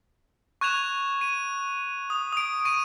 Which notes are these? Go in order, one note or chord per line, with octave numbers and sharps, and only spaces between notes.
C#6 F#6 G#6 E7 F7
D#7
D#6
D#6 D7
C#6 D7 D#7